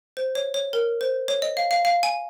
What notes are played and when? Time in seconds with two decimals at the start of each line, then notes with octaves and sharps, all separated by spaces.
0.17 C5
0.35 C#5
0.54 C#5
0.73 A#4
1.01 C5
1.28 C#5
1.42 D#5
1.57 F5
1.71 F5
1.85 F5
2.03 G#5